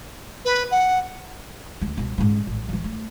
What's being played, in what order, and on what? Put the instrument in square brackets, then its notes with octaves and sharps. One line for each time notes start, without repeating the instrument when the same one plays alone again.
[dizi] B4
F#5
[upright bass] D2
C2 B2
G#2 C#4
A1
D3 E3
A3